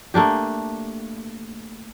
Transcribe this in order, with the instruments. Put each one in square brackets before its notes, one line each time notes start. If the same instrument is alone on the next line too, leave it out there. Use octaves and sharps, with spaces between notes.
[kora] A3 A#3 D4 G4